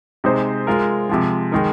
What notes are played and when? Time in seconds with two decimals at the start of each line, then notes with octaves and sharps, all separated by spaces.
0.24 C3 G#3 D#4 C5
0.67 G#3 F4 A#4
1.09 C3 F3 G#3
1.52 D#3 G#3 D#4 A#4